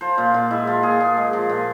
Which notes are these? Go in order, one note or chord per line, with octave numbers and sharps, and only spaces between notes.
F3 C5
A#2 F4
A#2 F4
G#3 E4
F3 F4
A#2 G#4
A#2
G#3
F3
A#2